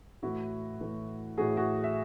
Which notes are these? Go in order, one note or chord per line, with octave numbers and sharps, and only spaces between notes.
A2 E3 A3 E4 F#4
A2 E3 A3
A2 E3 A3 F#4 G#4
F#4 G#4
E5